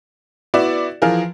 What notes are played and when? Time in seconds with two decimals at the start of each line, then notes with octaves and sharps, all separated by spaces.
0.54 B3 E4 F#4 D5 E7
1.02 E3 F3 F4 G#4 A#4